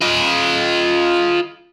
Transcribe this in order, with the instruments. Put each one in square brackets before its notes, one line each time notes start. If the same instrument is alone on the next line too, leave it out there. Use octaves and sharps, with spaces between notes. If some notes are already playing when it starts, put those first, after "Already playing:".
[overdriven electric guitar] F4 D#5